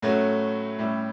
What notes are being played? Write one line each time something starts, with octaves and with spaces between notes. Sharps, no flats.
A2 F#3 A3 C#4 F#4
A2 G3 C#4 E4